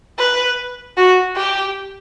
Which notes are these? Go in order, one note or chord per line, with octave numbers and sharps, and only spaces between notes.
B4
F#4
G4